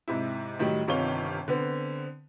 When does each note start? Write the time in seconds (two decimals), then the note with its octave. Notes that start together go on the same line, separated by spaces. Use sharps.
0.08 G#2 C3 E4
0.59 A2 D#3 F#3 G3
0.88 G1 C3 D#3 F4 C#5 G7
1.48 D3 B3 C4